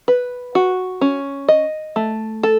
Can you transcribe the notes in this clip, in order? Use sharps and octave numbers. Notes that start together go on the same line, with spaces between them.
B4
F#4
C#4
D#5
A3
A4